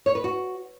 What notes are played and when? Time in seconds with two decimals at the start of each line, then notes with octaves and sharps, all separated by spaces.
0.06 C#5
0.15 B4
0.24 F#4